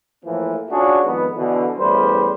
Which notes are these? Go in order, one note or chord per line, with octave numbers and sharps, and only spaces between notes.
A2 E3 F3 A#3
C#4 D4 F4 F#4 G#4 A4
F2 D#3 G#3 B3
B2 D3 E3
E2 A2 C#3 G3 B4 C5